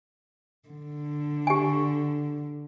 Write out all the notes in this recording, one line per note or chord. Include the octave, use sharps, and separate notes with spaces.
D3
G4 G#5